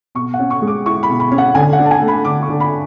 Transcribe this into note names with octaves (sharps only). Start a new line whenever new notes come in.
B2 C#6
F#5
C#4
C#6
G#3
D6
E4 C#6
B5
B2
B5
C#4
F#5
D3 G#5
F#5
D4
A5
G#5
A3
B5
D3 D6
C#6
D3
B5